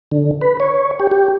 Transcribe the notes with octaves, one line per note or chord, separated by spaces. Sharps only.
D3
B4
C#5
G4
G4